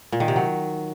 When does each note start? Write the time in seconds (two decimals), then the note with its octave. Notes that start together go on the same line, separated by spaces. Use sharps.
0.12 A#2
0.20 D#3
0.28 C3
0.36 F#3